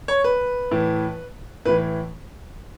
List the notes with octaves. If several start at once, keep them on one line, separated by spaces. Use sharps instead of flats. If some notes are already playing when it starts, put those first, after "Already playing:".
C#5
B4
A2 E3
A2 E3 B4